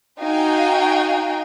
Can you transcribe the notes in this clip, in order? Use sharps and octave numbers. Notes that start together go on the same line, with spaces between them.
D#4 F#4 F5 G5 G#5